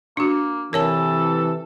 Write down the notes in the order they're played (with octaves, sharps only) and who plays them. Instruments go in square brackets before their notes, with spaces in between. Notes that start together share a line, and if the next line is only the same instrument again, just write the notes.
[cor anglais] A#3 [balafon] D4 F#4
[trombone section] C3 E3 [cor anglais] A4 [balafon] A#4 C#5 A5